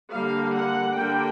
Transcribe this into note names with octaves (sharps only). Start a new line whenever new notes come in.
D3 G3 A#3 F5
F#5
D3 G3 A#3 G5